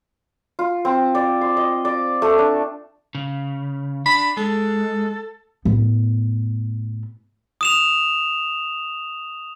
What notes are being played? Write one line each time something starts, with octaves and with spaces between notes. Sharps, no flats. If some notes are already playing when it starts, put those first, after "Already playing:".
F4
C4
D5
C6
D#5
D5
A3
D4
C#3
D4 B5
G#3 A4
A2 B3
D#6 E7 F7